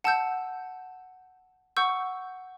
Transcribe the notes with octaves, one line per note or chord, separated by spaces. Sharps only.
F#5 A5 E6 G6
F#5 C#6 E6 G6